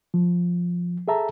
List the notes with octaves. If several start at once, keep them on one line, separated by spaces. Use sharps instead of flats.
F3
G#4 A4 E5 A5 A#5